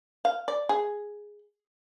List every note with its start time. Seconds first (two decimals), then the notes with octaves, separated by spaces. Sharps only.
0.25 F5
0.48 D5
0.69 G#4